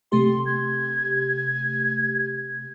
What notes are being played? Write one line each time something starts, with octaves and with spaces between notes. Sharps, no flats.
C3 A3 G4 C6
G#6